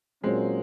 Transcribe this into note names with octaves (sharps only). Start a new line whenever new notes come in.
A#2 F#3 G#3 A#3 C4 C#4